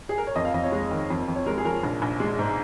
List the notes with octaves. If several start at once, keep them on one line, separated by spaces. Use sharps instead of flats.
G#4
A#4
C#5
F2 D#5
F5
F2 D#5
C#5
G#3
D#3
F2
F2
C#5
G#3 A#4
G#4
F3 A#4
A#1
A#1
G#3
G#2